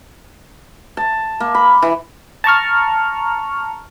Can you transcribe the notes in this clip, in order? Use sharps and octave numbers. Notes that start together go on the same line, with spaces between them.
A5
A#3
B5
E3
A5 A#5 C#6 F6